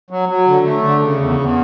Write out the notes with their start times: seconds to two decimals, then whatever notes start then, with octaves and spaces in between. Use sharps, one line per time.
0.11 F#3
0.29 F#3
0.47 D3
0.66 A3
0.84 D3
1.02 C#3
1.20 E2
1.39 E2